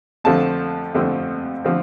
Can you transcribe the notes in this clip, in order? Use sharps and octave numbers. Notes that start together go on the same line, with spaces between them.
F2 D3 F3 A3 C4 A5
F2 D3 F3 A3 C4
D3 F3 A3 C4